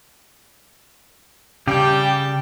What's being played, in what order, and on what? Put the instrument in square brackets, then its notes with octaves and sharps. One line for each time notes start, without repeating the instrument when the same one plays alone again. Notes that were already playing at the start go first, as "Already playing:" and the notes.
[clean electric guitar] C#3 [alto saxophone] G3 [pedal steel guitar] G4 [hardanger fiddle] G5 A5